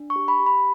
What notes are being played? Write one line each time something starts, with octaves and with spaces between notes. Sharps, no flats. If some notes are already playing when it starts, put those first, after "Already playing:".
Already playing: D4
C#6
G4
B5
G4
B5